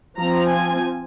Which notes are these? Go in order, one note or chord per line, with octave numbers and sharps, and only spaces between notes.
F3 C4 A#5
G#5